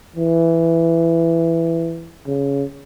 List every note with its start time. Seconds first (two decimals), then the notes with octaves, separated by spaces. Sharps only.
0.16 E3
2.27 C#3